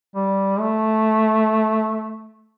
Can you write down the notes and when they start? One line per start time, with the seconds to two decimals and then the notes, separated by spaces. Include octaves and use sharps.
0.15 G3
0.60 A3